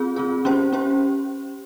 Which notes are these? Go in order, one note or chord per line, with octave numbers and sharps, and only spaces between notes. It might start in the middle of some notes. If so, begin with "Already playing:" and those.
Already playing: C4 F4 G#4
C4 F4 G#4
C#4 G4 C5
C#4 G4 C5